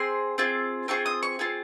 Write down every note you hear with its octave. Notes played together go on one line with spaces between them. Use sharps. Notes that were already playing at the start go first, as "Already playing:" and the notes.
Already playing: C4 G#4 C6
C4 F4 G#4
C4 F4 G#4 C#6
D#6
C#6
C4 F4 G#4